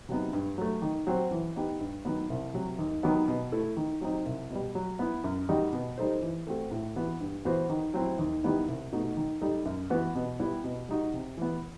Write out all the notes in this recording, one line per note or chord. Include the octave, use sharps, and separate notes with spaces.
C3 F#3 B3 D#4
G2
F#3 A3
D#3
F#3 C4 F#4 C5
E3
B3 D#4 G4
G2
D#3 F#3 B3
C2
C3 F#3
D#2
D#3 F#3 B3
B2
A3 E4 A4
D#3
F#3 C4 D#4
C2
B2 G3
F#3
B3 E4
F#2
D#3 G3 D#4 F#4
B2
G3 D#4 A4 C5
E3
A3 C4 F#4 A4
A2
E3 B3 F#4
G2
E3 B3 F#4 C5
D#3
F#3 C4 E4
D#2
D#3 G3 B3 E4
C2
B2 A3 D#4 F#4
D#3
G3 D#4 A4
F#2
E3 B3 F#4 B4
B2
G3 B3 E4 G4
B2
G3 D#4 F#4
C3
E3 B3